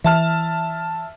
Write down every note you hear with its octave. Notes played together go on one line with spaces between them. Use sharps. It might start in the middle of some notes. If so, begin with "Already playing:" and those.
E3 E5 A5 F6